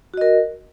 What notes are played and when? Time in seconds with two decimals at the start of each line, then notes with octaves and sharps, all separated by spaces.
0.14 F#4
0.17 D#5
0.21 A#4